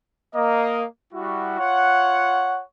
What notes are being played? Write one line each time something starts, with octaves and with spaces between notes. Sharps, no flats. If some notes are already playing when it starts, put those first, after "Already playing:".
A#3 D#5
G3 E4 F#4
F4 C#5 F#5